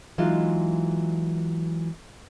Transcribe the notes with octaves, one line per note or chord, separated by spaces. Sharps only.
E3 F#3 G#3 D#4 F4